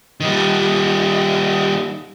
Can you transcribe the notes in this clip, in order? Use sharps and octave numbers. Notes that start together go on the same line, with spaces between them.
D#3 G3